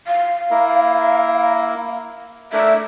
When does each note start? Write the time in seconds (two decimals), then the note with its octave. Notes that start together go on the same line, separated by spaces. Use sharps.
0.07 F5
0.51 A#3 E4 A#4
2.53 A3 D4 A#4 E5